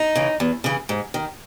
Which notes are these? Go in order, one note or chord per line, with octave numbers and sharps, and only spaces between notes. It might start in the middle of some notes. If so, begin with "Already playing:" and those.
Already playing: D#4
C#3 E3
E2
C#3 E3
G#2
D#3